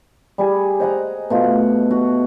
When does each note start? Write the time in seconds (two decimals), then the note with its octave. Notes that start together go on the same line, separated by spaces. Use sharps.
0.38 G3 G#4 G#5
0.80 C5 D#5 F#5 A#5
1.30 B2 A3 F4
1.44 F#5
1.91 F#4 F#5